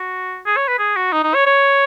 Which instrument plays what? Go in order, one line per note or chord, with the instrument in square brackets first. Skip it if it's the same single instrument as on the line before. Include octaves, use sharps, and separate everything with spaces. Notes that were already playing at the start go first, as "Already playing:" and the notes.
Already playing: [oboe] F#4
G#4
C#5
B4
G#4
F#4
D#4
D#4
C#5
C#5